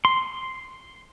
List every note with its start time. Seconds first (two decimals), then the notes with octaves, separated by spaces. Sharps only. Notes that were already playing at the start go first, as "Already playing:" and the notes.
0.05 C6